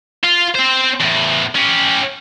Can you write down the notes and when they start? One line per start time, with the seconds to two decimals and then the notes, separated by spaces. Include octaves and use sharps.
0.24 F4
0.55 C4 C5
1.00 E2 A2
1.55 C#4 G4